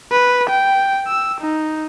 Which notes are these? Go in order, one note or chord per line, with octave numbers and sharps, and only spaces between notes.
B4
G5
E6
D#4